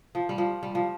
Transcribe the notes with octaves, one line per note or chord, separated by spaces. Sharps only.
F3
G3
F3
G3
F3